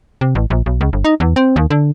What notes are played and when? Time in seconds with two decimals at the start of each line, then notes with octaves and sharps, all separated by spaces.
0.21 C3
0.35 A1
0.50 A#1
0.66 B1
0.81 C#2
0.93 G1
1.04 D#4
1.20 E2
1.36 C4
1.56 D#2
1.70 D3